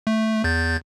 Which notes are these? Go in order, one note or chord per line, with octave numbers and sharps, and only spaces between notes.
A3
E2 G6 A6